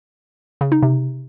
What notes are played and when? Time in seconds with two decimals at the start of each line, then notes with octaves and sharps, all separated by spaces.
0.61 C#3
0.72 D#4
0.83 C3